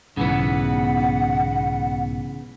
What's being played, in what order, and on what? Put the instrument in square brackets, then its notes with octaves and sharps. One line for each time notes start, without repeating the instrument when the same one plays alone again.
[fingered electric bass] B1 G#2 [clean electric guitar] C#3 E3 B3 [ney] F#5